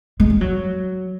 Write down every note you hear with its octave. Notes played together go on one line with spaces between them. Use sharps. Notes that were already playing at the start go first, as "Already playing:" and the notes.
G#3
G#3
F#3